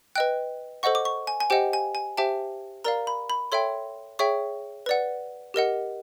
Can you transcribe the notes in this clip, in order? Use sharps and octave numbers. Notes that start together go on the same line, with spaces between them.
B4 D#5 G5 F#6
A4 C5 D#5 F#5 C#6
D6
C#6
G#5
G#5
G4 C5 D#5 F#5 G5
G#5
G#5
G4 C5 E5 G5 A5
A#4 D5 F5 A#5
B5
B5
A4 C#5 E5 G5 C6
G#4 C#5 E5 G5 C#6
B4 D5 F#5
G4 A#4 D#5 F#5